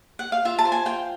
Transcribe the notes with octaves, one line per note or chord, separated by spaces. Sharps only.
F#5
F5
F4 E5
A5
C5
G#5
F4 G5